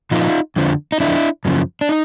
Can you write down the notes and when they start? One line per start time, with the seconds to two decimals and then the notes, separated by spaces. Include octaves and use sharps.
0.11 A#2 F3 D#4 F4
0.56 F2 D3 F3
0.92 D#4
1.00 F2 D3 F3 D4 E4
1.45 F#2 C#3 F3
1.81 D4
1.89 D#4